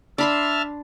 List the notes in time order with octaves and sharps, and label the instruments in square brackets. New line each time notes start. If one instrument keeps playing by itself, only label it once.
[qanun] D4 B5 C6 [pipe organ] E5 A5 F6